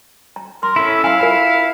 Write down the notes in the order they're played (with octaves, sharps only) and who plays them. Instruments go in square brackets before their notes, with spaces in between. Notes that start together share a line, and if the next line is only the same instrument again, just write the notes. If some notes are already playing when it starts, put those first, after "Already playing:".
[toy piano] A#5
[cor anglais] A#4 [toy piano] C6
[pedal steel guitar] C#4 E4 [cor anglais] A4
[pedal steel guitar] E4 [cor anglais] F5 [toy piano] G#5 A#5
[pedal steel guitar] E4 [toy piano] F4 A#4